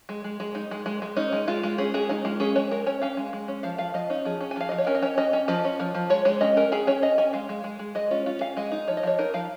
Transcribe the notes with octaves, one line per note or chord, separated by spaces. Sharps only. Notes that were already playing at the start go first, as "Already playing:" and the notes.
G#3
G#3
G#3
D#4
G#3
G#3
G#3
C#4 D#4
G#3
G#3 F4
G#3
C#4 G#4
G#3 G#4
C#4 D#4
G#3 F4
C#4 G#4
G#3 C#5
G#3 A#4
C#4 C#5
C#4 F5
G#3
G#3
C#4
F3 F5
F3 F5
F3 D#5
C#4 D#4
F3 G#4
C#4
G#5
F3 F5
F3 D#5
C#5
C#4 A#4
D#5
C#4 C#5
C#4 D#5
C#4
F3 D#5
C#4
F3
F3
G#3 C#5
G#3 C#5
C#4 D#5
C#4 A#4
C#4 G#4
C#4 C#5
C#4 D#5
C#4 G#5
G#3 F5
G#3
G#3
G#3
G#3 D#5
C#4 F4
C#4 F4
C#4 F5
G#3 D#5
D#4
F3 C#5
D#5
F3 C#5
D#4 A#4
F3 F5